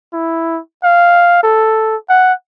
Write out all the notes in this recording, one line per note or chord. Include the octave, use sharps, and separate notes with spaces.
E4
F5
A4
F#5